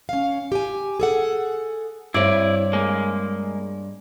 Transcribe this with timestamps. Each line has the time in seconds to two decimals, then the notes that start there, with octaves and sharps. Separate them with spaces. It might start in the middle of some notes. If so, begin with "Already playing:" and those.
0.09 C#4 F5
0.52 G4 G#5
1.00 G#4 A4 F#5
2.14 G2 C4 E4 C#5 D5
2.73 G#3 A#3